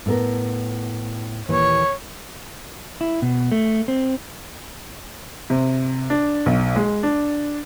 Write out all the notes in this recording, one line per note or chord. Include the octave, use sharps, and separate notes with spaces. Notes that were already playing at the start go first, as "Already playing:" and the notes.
A2 B3 A#4
D#2 A#2 E3 C#5
E4
B2
A3
C4
C3
D4
B1
G#3
D4